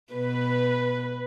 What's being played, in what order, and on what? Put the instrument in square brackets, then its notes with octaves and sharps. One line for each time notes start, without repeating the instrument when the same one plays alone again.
[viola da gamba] B2 [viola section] B4